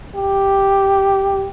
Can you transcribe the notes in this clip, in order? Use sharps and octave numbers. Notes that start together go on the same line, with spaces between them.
G4